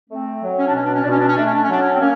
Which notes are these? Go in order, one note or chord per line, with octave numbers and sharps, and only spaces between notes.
A3 C4
F#3
C#4
D4
B2 C#4
D4
C#4
D4
B2 C#4
D4
C#4
A3 D4
C#4
D4
C#4
F#3 D4
C#4
C4
A#3 C#4